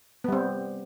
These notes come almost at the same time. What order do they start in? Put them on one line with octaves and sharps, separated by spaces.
B3 G3 C4